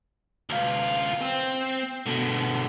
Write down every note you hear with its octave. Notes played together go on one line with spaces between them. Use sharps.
D2 F4
C4
B2 D3